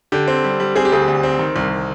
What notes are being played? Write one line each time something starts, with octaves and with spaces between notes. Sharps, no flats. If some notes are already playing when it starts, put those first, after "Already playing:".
D3 G4
C4
G3
G3
C4 G#4
G4
D2 G#4
D2
C4
D#3
C2